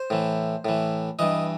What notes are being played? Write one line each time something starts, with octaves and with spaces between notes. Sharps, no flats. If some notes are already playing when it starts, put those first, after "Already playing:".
Already playing: C5
A2 E3
A2 E3
G2 E3 D#5